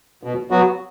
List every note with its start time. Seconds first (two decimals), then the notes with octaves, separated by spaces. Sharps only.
0.23 B2
0.50 F#3 B3 F#4